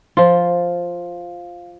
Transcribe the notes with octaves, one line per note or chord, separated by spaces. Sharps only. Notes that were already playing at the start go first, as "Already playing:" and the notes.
F3 F4